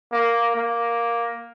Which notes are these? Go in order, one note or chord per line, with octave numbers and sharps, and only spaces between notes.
A#3
A#3